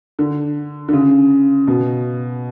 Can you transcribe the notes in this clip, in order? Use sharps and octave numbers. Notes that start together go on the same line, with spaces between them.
D3
D3
C#3
B2